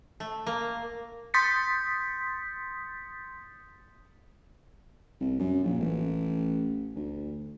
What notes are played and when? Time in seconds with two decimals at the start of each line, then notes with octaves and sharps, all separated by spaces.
0.20 A3
0.47 A#3
1.34 C6 D#6 G6 A6 B6 C#7
5.21 C2
5.39 F#2
5.64 A#1
5.80 A1
6.96 D2